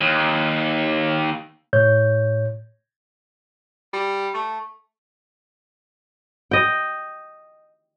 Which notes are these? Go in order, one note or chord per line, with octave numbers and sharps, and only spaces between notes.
D#2
A2 C#5 G6
G3
A3
D#5 G5